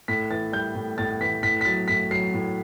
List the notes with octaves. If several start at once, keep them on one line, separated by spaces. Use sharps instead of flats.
A2 B6
E3 A6
G3 G6
A2
A2 A6
E3 B6
A2 B6
B6
F#3 A6
A2 B6
F#3 C7
A2